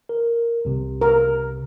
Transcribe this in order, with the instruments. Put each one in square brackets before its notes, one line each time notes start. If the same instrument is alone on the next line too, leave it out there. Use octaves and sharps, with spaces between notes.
[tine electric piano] A#4
C2 C3
[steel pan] A#4